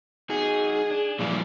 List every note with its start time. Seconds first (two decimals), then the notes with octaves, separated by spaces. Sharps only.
0.30 D#4 F#4 G#4
0.91 D4
1.19 A#2 E3 F3 G3